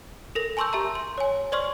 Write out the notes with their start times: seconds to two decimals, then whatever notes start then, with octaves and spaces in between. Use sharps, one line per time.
0.35 A4 A#4 A#6
0.57 G#5 A5 C6 C#6 E6 G6
0.73 G4 E5 A#5
0.95 C6
1.18 C#5 G#5
1.52 C5 D5 C6 C#6 F6